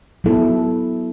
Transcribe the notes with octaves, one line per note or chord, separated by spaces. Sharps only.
F#3 B3 E4 A4